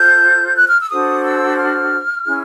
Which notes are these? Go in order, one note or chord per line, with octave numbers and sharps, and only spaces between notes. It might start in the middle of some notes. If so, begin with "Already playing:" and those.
Already playing: F4 A4 C5 G6
F#6
F6
E6
D4 F#4 A4 C5 D#6
E6
F6
C#4 E4 G#4